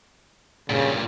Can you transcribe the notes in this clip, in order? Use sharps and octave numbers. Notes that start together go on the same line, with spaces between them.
G2 A#2 C#3